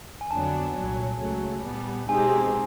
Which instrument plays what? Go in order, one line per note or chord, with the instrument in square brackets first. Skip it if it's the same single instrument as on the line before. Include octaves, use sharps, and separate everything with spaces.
[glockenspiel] G#5
[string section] F2 D3 F#3 B3 D4 [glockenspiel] A5
[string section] C2 A#2 F#3
C#2 C#3 F#3 A3
A#2 G3 B3
[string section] B2 G#3 C4 D#4 G4 [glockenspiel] G#5